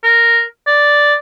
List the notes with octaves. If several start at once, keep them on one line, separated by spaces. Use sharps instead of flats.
A#4
D5